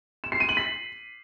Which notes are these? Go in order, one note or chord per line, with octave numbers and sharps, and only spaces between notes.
E7
C7
D#7
F#7
B6